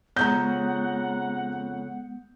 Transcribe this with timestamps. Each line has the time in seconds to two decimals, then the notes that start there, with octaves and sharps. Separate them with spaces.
0.16 F2 C#3 G#3 B3 C#4 F#5 A#5 G6